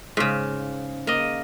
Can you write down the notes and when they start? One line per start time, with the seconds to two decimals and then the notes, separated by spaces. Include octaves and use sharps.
0.17 G#2 C#3
1.07 A#3 D#5